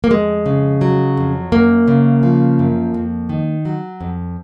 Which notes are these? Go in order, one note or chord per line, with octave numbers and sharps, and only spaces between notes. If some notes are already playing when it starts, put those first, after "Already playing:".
A#3
F2 G#3
C#3
F#3
F2
F#2 A#3
C#3
F3
F#2
F2
D#3
F#3
F2